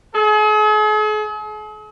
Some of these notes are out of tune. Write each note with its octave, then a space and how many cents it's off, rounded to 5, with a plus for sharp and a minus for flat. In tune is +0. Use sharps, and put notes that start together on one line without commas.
G#4 +45